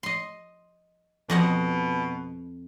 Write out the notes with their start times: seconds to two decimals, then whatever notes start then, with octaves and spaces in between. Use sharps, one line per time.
0.03 D#5 C6
1.30 F2 B2 D#5 F#5